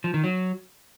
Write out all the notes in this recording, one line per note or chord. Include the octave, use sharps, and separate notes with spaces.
F3
D#3
F#3